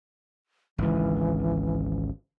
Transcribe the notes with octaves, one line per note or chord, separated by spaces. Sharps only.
G#1 C#2 E3